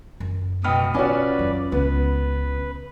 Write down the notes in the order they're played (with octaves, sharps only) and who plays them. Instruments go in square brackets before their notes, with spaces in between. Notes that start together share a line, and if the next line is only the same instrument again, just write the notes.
[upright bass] F#2
[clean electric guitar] C#2 B3 G5 [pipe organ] B2 D#5 [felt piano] B5 D#6 F6
[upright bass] B1 [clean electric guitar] C#4 F4 [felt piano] F#4 C#5 G#5 [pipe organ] B4 D5
[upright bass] F#2 F#3
[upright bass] C#2 [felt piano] B3 [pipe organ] B4